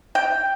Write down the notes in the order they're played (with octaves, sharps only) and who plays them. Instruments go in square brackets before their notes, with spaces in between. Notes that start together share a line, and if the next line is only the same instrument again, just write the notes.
[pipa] G5